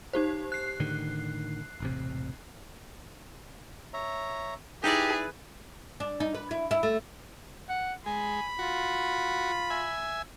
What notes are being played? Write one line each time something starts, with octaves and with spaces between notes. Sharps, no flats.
D#4 G4 C5
F#6 C7
A2 D3 D#3
E1 A1 C3
C#5 E5 A#5
D#4 E4 G4 G#4 B4 D5
D4
D#4
B4
E4
E4
A3
F#5
G#3 G#5 B5
F4 F#4
E5 G#5